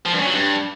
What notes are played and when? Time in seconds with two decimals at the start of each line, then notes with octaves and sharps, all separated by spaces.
0.05 F3
0.12 G2
0.19 C#3
0.26 F#3
0.33 G2